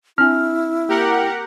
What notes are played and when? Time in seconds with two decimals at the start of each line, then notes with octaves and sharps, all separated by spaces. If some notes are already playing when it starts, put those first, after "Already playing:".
0.18 C4 D4 E4 G#5 F6
0.89 A#3 G4 A#4 F#5